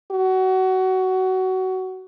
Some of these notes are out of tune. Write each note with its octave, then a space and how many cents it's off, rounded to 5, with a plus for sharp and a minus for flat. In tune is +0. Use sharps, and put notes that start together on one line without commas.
F#4 +20